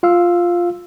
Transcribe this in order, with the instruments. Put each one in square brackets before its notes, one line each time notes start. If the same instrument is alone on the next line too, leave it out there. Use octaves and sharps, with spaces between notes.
[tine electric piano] F4 F5 E6